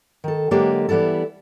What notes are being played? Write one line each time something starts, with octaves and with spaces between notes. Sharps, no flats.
D#3 A4
D3 F#3 G#3 A#3 G4 A4
E3 G3 B3 E4 A4